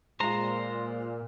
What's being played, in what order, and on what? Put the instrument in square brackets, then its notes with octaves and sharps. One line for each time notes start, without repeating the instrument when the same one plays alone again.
[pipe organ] A#2 [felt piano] G#3 F4 [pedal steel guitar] C5 A#5